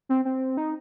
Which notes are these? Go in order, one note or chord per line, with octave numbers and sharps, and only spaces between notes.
C4
C4
D#4